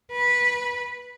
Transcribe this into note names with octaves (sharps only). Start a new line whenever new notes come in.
B4